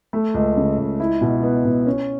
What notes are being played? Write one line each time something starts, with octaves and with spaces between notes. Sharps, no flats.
A3
C#2
C#3
C#2
E4
B2
B3
B2
C#4